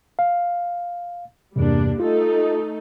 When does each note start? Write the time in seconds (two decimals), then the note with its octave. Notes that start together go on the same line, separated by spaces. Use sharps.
0.19 F5
1.56 E2 G2 C3 G3 A#3 D4
2.00 A3 D#4 F4 A4